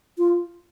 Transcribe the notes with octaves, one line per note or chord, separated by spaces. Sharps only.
F4